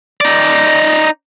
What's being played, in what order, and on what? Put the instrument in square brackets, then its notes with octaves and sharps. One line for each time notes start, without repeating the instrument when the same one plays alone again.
[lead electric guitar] D#4 D5